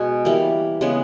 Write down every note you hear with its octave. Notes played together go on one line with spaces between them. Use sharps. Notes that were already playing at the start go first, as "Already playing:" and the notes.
Already playing: B2 G#3 G#5
E3 G3 A#3
C#3 G#3 B3